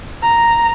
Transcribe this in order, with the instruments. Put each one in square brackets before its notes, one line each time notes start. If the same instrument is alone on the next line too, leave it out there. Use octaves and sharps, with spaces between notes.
[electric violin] A#5